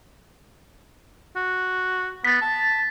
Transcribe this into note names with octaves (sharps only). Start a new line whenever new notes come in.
F#4
B3 A6 B6
A5